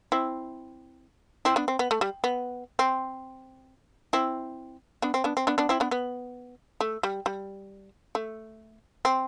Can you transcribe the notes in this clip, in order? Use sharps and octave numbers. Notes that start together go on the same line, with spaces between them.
C4 E4
C4 E4
B3 D4
C4
B3
A3
G3
B3
C4
C4 E4
B3 D4
C4
B3 D4
C4
B3 D4
B3 D4
C4 E4
B3 D4
B3
A3
G3
G3
A3
C4